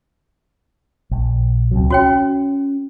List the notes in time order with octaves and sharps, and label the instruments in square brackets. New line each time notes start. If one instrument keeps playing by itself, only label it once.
[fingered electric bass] A#1
C#2 C3 F#3
[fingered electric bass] C#4 [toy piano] F#4 C#5 G5